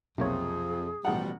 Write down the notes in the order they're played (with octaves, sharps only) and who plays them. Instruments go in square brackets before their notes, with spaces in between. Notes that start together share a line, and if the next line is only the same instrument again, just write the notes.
[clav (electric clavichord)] B1 A#3 C#5 [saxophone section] F2 [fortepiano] C3 [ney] G#4
[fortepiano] A1 F#5 [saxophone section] B2 F3 G3